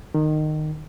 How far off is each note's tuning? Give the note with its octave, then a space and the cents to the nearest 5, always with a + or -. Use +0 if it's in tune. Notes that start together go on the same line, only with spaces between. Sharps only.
D#3 -20